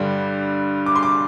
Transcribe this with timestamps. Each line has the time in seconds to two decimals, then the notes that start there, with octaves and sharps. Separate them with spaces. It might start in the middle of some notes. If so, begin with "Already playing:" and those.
Already playing: G2 D3 G3
0.86 D6
0.96 C6
1.03 D6